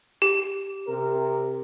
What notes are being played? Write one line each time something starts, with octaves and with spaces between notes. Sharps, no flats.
G4
C3 A#4